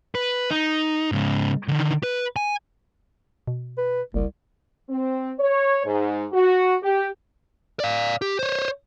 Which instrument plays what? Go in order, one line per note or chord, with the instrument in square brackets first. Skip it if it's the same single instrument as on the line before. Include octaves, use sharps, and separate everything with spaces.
[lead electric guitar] B4
D#4
G#2 C#3
D3 D#3
B4
G#5
[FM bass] B2
[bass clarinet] B4
[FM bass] F#1 [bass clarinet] C2
[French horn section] C4
C#5
G#2
F#4
G4
[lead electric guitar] D5 F5
G4
C5 C#5